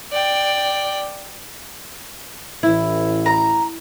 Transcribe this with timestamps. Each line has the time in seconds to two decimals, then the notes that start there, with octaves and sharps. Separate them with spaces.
0.12 D5 G5
2.63 A1 E4
3.26 A#5